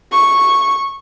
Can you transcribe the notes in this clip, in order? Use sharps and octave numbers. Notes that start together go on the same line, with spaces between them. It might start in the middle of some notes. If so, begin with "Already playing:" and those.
C#6